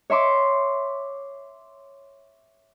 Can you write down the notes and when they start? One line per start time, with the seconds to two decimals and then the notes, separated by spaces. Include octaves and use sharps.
0.10 C#5 E5 C6 D6